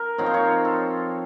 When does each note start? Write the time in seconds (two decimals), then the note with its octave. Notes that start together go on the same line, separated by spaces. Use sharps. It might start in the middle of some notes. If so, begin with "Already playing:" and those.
Already playing: A#4
0.18 F3 C4 D#4 C#5
0.26 C5
0.34 C#5
0.65 A4